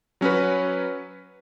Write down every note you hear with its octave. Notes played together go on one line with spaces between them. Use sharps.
F#3 C#4 F#4 B4